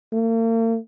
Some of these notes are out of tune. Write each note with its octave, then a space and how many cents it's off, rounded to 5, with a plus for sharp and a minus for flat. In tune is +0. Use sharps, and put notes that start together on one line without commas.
A#3 -45